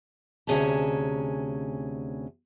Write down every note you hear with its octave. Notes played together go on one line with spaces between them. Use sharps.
D2 C3 C#4 G#4 A5 A#5